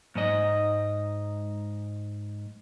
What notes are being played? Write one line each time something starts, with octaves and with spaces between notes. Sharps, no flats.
G#2 G#3 D#5